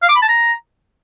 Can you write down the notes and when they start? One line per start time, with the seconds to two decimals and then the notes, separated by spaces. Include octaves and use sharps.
0.02 F5
0.09 D6
0.15 B5
0.22 A5
0.28 A#5